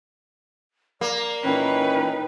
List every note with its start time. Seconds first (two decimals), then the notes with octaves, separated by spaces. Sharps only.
1.01 A#3 D5
1.44 A#2 E3 C#4 D#4 B4 G5